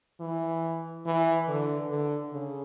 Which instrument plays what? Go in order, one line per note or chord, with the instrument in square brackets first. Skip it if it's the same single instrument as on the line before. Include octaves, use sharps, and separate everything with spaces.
[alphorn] E3
E3
D3
D3
C#3